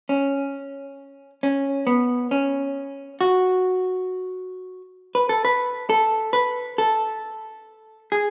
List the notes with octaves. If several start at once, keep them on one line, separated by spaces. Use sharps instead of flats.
C#4
C#4
B3
C#4
F#4
B4
A4
B4
A4
B4
A4
G#4